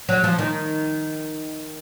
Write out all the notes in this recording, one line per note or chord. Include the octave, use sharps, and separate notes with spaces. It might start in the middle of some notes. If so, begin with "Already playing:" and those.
F#3
F3
D#3